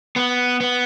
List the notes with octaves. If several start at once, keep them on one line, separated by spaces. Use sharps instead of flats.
B3
B3